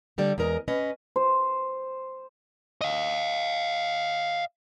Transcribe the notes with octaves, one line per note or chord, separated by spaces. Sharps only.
D3 G3 A4 D5
E2 G#3 A#4 D#5
C#4 B4 D#5
C5
D#5 F5